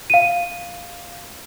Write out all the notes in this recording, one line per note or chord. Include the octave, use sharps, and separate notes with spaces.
F5 D#7